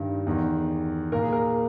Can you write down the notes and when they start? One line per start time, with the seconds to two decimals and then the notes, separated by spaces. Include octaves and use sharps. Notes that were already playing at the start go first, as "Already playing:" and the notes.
Already playing: G2 D#3
0.26 E2 D#3
1.12 A#2 A#4
1.23 G#4
1.33 A#4